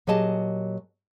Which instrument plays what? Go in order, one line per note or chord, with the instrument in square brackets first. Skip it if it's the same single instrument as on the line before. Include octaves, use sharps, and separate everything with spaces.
[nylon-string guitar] A#2 F#3 G4 G#4 D#5 A5